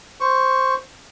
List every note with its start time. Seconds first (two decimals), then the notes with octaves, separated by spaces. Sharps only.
0.20 C5 C#6